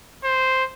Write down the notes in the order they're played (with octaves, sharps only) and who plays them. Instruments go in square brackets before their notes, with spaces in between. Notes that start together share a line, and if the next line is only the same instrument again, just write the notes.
[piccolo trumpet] C5